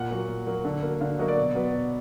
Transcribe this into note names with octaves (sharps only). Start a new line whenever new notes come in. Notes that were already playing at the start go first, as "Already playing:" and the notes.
Already playing: A#2 F#5
F#3 A#3
A#2
F#3 A#3
D3
F#3 A#3
D3 F5
F#3 A#3 D#5
D5
B2
F#3 B3
B2